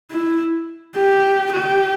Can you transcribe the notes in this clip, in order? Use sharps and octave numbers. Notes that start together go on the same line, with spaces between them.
E4
G4
G4